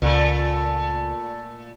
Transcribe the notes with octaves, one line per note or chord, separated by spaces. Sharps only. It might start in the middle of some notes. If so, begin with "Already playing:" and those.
C#2 A#2 A3